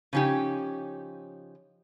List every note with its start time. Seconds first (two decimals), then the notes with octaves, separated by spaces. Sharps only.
0.13 C#3 F3 C#4 D#4 G4